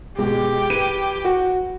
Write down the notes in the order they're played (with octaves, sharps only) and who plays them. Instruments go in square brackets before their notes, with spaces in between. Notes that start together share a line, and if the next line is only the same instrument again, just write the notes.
[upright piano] B2 [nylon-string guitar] G#3 [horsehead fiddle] G4
[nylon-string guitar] B4 [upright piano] D#7
[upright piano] F#4